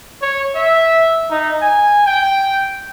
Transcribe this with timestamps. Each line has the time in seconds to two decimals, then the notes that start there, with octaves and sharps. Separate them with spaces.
0.22 C#5
0.55 E5
1.31 D#4
1.61 G#5
2.06 G5